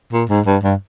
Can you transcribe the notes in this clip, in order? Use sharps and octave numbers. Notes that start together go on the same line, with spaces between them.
A#2
G#2
G2
G2